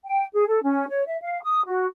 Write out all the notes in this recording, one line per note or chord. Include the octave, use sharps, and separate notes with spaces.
G5
G#4
A4
C#4
C#5
E5
F5
D#6
F#4